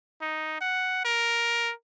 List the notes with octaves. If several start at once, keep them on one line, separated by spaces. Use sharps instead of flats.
D#4
F#5
A#4